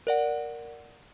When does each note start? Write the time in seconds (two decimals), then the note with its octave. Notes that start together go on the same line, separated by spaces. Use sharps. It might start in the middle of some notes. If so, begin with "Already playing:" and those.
0.07 A#4 D5 F#5